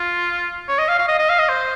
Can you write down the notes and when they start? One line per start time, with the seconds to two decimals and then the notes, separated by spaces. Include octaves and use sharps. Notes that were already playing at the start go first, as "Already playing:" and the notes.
Already playing: F4
0.68 C#5
0.78 D#5
0.88 F5
0.98 F5
1.08 D#5
1.19 D#5
1.29 F5
1.39 D#5
1.49 C5